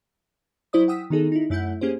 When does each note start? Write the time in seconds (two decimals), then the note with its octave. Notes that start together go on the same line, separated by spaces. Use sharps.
0.73 F#3 E4 C5 D5 D#6
0.88 F#5 G5 D#6 E6 B6
1.10 D#3 B3 D#4 G#4 A4
1.32 D#4 E4
1.50 F#2 A3 E4 F#5 G6
1.81 A#3 C#4 G4 G#4 C5